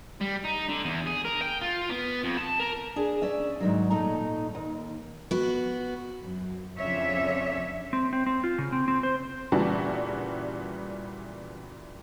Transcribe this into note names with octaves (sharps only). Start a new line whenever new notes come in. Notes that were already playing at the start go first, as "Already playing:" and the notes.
G3
D#4
D3
E2
G#4
A#4
G5
F4
B3
F2
A5
A#4
D4 G#4
C#4 D5 E5
G#2 D#3 F#3
A#2 A3 D#4 A#5
D#2
B3 F#4
F#2
F2 C#3 C#4 D4 C#5 E5
C4
C4
C4
F4
C#3
C4
C4
C5
A#2 C#3 E3 G3 F#4 A5